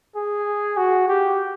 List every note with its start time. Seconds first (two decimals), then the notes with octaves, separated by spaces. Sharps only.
0.16 G#4
0.77 F#4
1.08 G4